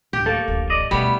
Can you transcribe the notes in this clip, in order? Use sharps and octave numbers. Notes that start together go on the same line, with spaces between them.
D1 D2 G4
A#3 A4 C#5
D1 A1
D5 D#5
D2 B2 G3 A3 B3 C#5 B5